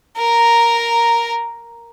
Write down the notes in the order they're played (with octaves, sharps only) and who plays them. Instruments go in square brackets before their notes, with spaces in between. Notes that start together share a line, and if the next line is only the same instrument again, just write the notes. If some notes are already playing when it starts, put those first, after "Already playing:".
[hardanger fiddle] A#4 A#5